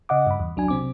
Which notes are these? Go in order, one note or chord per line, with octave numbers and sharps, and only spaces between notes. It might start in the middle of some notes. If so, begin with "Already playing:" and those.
C#3 D#5 F#5 D6
G2 B5
E2
C2 F#3 D4 G#5
C3 C4 D6